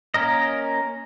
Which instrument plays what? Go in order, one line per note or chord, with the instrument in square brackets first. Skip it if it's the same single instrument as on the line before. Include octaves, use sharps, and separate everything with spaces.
[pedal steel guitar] A#3 C#4 A#4 D#5